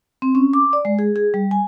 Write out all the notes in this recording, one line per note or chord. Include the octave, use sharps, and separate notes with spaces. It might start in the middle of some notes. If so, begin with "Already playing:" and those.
C4
C#4
D6
D5
G#3
G#4
G#4
G3
G#5